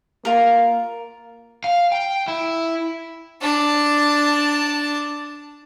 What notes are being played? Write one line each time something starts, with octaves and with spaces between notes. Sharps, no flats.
A#3 F4 A#4
F5
G5
E4
D4 A5